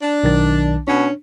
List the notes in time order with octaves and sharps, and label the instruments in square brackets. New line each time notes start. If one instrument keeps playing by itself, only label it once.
[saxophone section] D4
[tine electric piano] B1 D#3 A6
[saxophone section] B2 C#4 [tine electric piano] D4